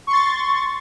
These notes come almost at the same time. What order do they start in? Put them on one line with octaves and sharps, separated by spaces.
C#6 C6 A6